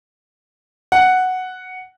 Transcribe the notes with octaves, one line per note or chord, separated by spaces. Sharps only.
F#5